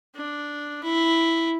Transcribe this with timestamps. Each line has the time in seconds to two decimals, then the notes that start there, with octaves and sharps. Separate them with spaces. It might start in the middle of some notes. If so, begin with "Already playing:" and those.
0.16 D4
0.83 E4